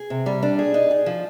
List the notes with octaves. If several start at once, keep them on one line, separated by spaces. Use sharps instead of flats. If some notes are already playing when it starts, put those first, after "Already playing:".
Already playing: G#4
C3
G3
D4
G#4
D#4
G#4
F3